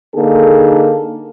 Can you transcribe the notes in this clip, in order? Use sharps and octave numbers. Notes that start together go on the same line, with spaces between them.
D3 A#3 D#4 G#4 A4